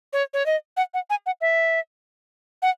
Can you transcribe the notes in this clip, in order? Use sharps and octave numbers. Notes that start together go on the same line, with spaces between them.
C#5
C#5
D#5
F#5
F#5
G#5
F#5
E5
F#5